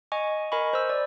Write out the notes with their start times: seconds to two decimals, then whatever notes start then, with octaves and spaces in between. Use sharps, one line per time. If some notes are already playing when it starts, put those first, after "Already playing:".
0.12 D#5 G#5 C#6
0.52 A#4 D#5 G#5 B5 C#6
0.73 C5 E6
0.90 D5